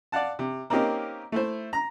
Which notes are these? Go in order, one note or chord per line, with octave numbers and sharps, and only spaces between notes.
D5 F5 F#5 A5
C3
A#3 C4 C#4 D#4 G4 A#4
A3 E4 C5
A#5